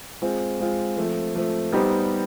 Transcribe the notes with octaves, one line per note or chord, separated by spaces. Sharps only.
G#3 C4 F4
G#3 C4 F4
F3 A3 C4
F3 A3 C4
G3 B3 D#4 G4 C5